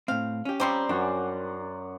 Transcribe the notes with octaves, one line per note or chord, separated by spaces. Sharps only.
A2 C4 F5
C#4 G4
F3 G3 C4 D5 A#5 C6
F#2 D4 F#4 F#5